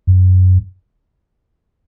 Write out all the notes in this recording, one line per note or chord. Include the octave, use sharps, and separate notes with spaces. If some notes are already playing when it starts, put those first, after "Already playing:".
F#2